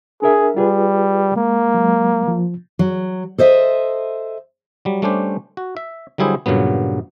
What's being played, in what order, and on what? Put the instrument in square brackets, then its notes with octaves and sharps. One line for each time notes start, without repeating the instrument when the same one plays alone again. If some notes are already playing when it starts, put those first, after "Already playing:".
[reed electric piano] D4 A#4 E5 [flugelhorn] G#4
[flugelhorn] G3 [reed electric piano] F4 G#4 B4
[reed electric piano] G#3 [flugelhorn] A#3
[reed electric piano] F#3 G#3
F3 F4
[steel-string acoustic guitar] F#3
A4 C5 D#5 E5
[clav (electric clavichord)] F#3 G3
G3 A3 C#4 D4 G4 C5
F#4
E5
D3 F#3 G3 E4 G#4 C5
G2 A#2 C#3 F#3 B3